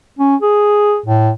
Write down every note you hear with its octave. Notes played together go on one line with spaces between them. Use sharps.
C#4
G#4
A2